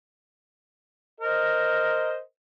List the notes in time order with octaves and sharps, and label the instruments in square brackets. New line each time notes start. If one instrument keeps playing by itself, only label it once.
[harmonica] A#4 C5 D#5